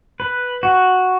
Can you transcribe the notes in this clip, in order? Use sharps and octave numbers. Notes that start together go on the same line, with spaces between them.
B4
F#4